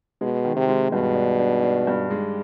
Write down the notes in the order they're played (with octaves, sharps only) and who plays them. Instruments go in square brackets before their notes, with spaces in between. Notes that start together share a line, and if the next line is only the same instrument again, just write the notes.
[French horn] B2 [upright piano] G#3
[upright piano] D#3
[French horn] C3
[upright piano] G#3
[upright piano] G2 [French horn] B2
[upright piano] D4
D4
D4
G2
G#3